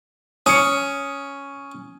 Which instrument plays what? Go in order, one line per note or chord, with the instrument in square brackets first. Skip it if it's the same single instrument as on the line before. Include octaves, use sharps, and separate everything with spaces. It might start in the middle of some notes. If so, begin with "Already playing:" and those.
[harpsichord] C#4 [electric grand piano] D#6 C#7